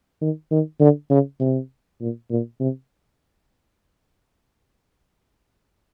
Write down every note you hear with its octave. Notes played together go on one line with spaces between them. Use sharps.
D#3
D#3
D3
C#3
C3
A#2
A#2
C3